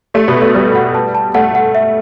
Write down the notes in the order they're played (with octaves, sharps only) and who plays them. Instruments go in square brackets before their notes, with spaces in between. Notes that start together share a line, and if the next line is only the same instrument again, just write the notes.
[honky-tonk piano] A3 [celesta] G4
[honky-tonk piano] B2 B3
[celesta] G4
[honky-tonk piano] A3
[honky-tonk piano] G3 [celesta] B4
[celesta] F#5
A5
A5
[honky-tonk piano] A3 [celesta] F#5
[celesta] F#5
E5